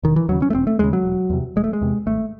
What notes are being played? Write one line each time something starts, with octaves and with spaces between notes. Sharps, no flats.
E1 D#3
E3
D#2 C#3 F#3
C#4
A3
E1 C4
A3
D#2 C#3 G#3
F#3
E1
E2 C3
E1 G#3
A3
G#3
E2 C3
G#1 A3